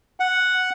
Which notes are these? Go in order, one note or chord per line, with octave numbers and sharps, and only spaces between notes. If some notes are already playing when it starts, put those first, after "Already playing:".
F#5